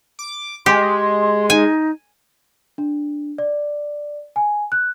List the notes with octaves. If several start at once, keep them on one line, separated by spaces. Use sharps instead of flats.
D6
G#3 G4 C6
D#4 G#5
D4
D5
G#5
F#6